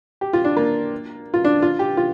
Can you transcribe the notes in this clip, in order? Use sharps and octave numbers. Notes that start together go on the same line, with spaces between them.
G4
F4
D4
A#3
F4
D4
F4
G4
F4